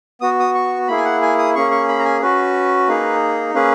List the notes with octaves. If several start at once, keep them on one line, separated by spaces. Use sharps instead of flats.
B3 F#4 D#6
D#6
C#6
A#3 E4 G#4 B5
G#5
F#5
G#5
D#6
A#3 C#4 G#4 C#6
C#6
B5
A#5
G#5
C#4 F#4 B4
A#3 D#4 G#4
A#3 C#4 G#4 B4